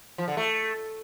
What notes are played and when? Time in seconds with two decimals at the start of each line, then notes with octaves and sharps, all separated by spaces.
0.18 F3
0.28 D3
0.37 A3